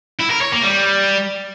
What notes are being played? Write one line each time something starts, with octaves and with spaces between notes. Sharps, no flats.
E4
A#4
C#5
A#3
G3